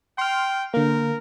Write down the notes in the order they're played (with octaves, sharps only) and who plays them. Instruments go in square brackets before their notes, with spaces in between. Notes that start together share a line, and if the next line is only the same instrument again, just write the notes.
[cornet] G5 [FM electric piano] C6 F6
[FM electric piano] D3 A#3 [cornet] A#4